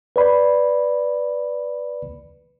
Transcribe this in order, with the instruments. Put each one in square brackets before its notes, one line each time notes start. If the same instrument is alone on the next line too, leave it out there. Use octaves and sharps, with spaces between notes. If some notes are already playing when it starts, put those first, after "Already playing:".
[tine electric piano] B4 D5 B5